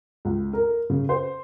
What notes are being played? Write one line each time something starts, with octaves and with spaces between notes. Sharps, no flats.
C#2
A#4
C#3
C5